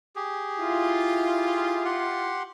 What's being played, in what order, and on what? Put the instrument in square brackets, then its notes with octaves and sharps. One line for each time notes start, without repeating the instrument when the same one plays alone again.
[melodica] G4 G#4
[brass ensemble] E4 F4
[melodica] G4 F#5 C6